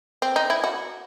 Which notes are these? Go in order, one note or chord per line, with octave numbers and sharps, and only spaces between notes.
C4
D#4
E4
F#4